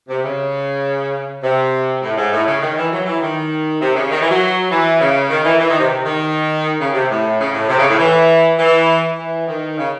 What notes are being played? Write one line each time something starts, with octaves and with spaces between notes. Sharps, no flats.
C3
C#3
C3
A2
G#2
A2
C#3
D#3
E3
F#3
E3
D#3
C3
C#3
D#3
E3
F#3
E3
C#3
D#3
E3
E3
D#3
C3
C3
D#3
C#3
C3
A2
C#3
A2
C3
C#3
A2
E3
E3
E3
D#3
C#3